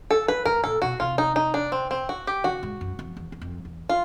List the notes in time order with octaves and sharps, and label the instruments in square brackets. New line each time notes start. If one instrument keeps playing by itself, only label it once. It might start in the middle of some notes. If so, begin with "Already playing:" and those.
[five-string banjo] A4
[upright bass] G2 [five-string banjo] B4
[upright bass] G#2 [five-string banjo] A#4
[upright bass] A#2 [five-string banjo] A4
[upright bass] B2 [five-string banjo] F#4
[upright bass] C3 [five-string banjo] F4
[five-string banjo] D#4
D#4
D4
C4
C4
F#4
G4
[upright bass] C#3 [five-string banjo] F#4
[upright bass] G#2
F#2
F2
E2
E2
F2
E2
[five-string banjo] F4